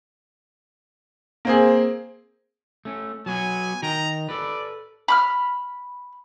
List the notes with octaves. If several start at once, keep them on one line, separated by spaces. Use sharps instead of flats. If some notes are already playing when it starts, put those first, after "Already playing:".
A#3 C4 G#4
A3 C#4
F#3 B3 F#4 G#5
D#3 G5 A#5
A4 B4 D5
B5 D6 F6